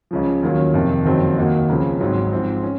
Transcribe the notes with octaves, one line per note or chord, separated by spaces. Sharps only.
C#2 C#3 F3
D#2 D#3 F#3 C#4 F4
F2 C3 D#3
F#1 F2 D#3 F#3 C4
D#2 D#3 A#3 D#4 F#4
C#2 C#3 F3 C4
G#1 G#2 F#3 C4 D#4
G#2 F3 C4
C#4